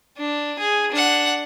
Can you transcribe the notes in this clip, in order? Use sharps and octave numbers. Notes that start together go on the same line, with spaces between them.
D4
G#4
D4 F#5